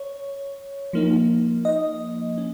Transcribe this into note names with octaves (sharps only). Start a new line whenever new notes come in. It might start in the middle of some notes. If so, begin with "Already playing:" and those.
Already playing: C#5
F3 A#3 D#4
D#5
C#4